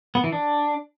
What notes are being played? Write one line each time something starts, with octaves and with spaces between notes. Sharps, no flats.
B3
E3
D4